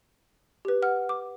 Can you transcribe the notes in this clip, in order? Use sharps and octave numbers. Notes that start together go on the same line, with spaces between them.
G4 B4
F#5 F6
D6